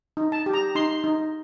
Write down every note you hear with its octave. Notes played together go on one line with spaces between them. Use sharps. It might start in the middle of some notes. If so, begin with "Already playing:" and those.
D#4
A5
G4
A#5
D#4 C6
D#4